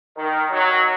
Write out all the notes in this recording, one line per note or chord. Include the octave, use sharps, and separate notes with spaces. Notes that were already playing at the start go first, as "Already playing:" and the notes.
D#3
F#3